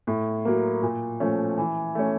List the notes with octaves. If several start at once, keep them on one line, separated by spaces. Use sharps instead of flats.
A2
F#3 A#3
A#2
F3 A3 C#4
E3
A3 C#4